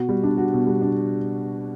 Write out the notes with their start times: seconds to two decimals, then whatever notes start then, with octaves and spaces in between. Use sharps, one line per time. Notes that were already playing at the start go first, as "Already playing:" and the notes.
Already playing: B2 F#4
0.09 G3
0.23 D4
0.37 F#4
0.53 B2
0.67 G3
0.81 D4